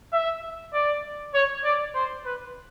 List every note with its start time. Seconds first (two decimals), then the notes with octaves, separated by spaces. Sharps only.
0.13 E5
0.73 D5
1.34 C#5
1.64 D5
1.95 C5
2.25 B4